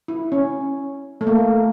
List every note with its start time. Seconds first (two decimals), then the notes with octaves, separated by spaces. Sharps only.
0.08 E4
0.32 C#4
1.21 A3
1.27 A#3